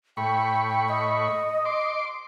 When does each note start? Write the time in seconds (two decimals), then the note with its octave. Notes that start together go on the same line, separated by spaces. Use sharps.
0.17 A2 G5 B5 C#6
0.89 D#5
1.65 C6 D6